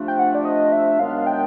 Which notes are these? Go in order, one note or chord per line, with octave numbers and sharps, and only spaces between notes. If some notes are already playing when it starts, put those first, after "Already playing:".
Already playing: C3 F3 A3 D4
G5
F#5
D5
D#5
E5
F#2 D#3 G#3 B3 D4 F5
G5